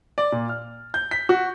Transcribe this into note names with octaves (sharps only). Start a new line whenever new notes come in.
D5
A#2
F6
G6
B6
F#4